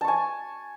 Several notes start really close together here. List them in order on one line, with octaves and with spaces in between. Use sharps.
A5 C#6 G#5